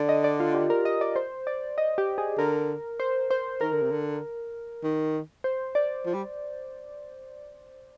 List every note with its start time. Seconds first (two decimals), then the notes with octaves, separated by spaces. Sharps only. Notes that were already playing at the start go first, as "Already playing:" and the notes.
Already playing: D3 D5
0.09 D#5
0.24 D5
0.40 F4
0.55 G4
0.70 A#4
0.85 D#5
1.01 D5
1.16 C5
1.47 D5
1.78 D#5
1.98 G4
2.18 G#4
2.38 D3 A#4
3.00 C5
3.31 C5
3.61 D#3 A#4
3.72 D3
3.82 C3
3.91 D3
4.83 D#3
5.44 C5
5.75 D5
6.06 F3
6.14 G3